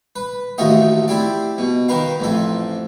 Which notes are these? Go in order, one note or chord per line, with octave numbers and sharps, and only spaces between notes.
B4
A1 D#2 A3 F4 F#4 D#5
C4 E4 G4 D5
B2
D#3 A#4 B4 F5
A1 F2 A4